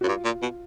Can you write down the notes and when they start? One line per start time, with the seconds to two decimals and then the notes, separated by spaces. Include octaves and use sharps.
0.01 F#2 F#4
0.07 G2 F4
0.25 A#2
0.42 B2